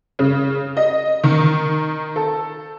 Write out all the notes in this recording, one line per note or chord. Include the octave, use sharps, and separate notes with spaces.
C#3
D#5
D#3
A4